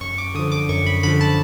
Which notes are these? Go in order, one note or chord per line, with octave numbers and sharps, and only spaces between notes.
F#2 C#6
D6
D3 F3 D#6
D6
F#2 C#6
B5
D3 F3 B5
A5